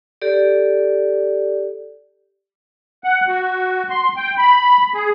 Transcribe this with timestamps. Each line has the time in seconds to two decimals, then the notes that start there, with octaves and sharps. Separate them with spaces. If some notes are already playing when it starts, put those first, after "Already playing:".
0.22 G4 A4 D5
3.04 F#5
3.28 F#4
3.90 C6
4.16 G5
4.38 B5
4.94 G#4